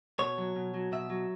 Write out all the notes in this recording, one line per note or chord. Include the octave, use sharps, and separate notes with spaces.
B2 C#5
F#3
B2
F#3
B2 E5
F#3